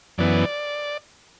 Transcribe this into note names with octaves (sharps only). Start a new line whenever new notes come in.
F#2 E3 B3 D5